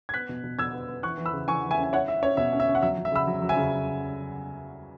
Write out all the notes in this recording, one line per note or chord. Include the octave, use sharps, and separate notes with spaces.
G#6
B3 F#6 B6
B2
B2
B2 E6 G#6
B3
B3
E3 C#6 F#6
E3
B5 E6
C#3
E3 G#5 C#6
E3
E5 G#5
C#4
G#5
E4 C#5 F#5
E4 E5
C#4 C#5
B2 E5
C#4
E5
C#4
F#5
F#3 E5
F#3
E5
C#3 B5 E6
F#3
F#3
E5 G#5
C#3